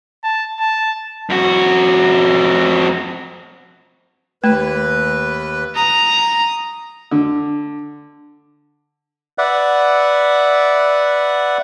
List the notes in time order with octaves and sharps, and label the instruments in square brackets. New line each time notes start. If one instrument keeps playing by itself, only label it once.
[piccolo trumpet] A5
A5
[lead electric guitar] F2 F#4
[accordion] D#2 B4 [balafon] A3
[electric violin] A#5 [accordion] D#6
[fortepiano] D3
[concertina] B4 D5 E5 F#5